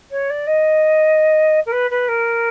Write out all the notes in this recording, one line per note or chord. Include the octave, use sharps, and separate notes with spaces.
C#5
D5
D#5
A#4
B4
B4
A#4